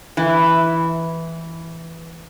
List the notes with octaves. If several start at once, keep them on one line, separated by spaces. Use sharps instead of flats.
E3 E4